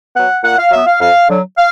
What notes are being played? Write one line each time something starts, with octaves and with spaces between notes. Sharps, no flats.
F#3 B3 F#5
A#2 F#5
F5
F#3 B3 E5
F5
F2 F5
D3 F#3
F5